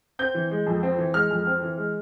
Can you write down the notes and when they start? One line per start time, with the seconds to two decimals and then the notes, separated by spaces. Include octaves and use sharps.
0.19 C4 G6
0.35 E3
0.51 G#3
0.67 F2
0.83 C4
0.98 E3
1.14 G#3 F6
1.31 F2
1.47 C4
1.62 E3
1.78 G#3